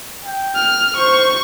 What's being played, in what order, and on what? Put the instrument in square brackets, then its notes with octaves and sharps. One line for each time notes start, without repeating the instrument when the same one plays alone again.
[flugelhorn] G5
[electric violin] F6
[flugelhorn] C5 [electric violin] C#6